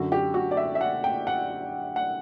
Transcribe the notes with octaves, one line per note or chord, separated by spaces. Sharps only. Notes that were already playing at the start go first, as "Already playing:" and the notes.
Already playing: F#2 D3 F#3 F#4
G4
F#4
D5
E5
E5
F#5
G5
F#5
F#5